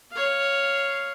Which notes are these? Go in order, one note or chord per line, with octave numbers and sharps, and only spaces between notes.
C#5 F5